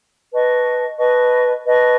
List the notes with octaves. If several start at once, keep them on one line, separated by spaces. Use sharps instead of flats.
B4 D#5 A5 C#6
B4 D#5 A5 C#6
B4 D#5 A5 C#6